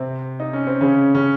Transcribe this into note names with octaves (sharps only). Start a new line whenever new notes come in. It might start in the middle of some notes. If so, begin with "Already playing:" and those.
Already playing: C3 C4
D#4
C#4
C4
C#3 C#4
C#3 C#4